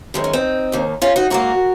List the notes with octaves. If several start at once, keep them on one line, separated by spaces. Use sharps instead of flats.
F#2 D#3 G#3 C4
C#4
C4 D#4
D#2 D#3 A#3
C#4 F4
D#4 F#4
G#2 F#3 A#3 F#4 A#4